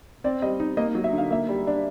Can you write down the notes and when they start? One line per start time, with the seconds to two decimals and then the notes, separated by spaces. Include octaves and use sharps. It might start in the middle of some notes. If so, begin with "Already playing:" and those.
0.24 C4 D5
0.42 G3 D#5
0.60 D#4
0.77 A#3 D#5
0.95 F#3
1.04 E5
1.13 D3
1.18 F5
1.31 A#3 E5
1.49 G3
1.67 D4